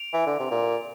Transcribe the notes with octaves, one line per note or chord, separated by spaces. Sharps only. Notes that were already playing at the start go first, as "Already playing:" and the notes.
Already playing: D7 F7
E3
D3
C3
A#2